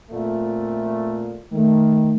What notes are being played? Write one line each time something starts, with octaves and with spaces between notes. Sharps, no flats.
F2 A#2 A3
D#3 A3